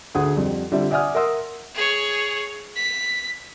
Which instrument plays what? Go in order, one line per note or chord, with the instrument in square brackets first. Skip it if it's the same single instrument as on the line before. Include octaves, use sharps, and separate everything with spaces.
[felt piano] D2 G#4 F#5 D#6
F2 G3
D3 G3 C4 F4 E5
D5 E5 F#5 G#5 D#6 F6
A#4 E5 F#5 C6 D#6 E6
[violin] G#4 C#5
B6